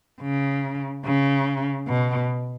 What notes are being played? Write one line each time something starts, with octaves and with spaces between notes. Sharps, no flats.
C#3
C#3
B2